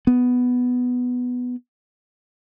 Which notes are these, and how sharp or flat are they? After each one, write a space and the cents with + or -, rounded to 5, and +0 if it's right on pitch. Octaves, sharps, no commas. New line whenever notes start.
B3 +5